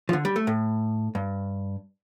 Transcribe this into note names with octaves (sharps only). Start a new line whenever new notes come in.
F3
D3
G3
A3
A2
G2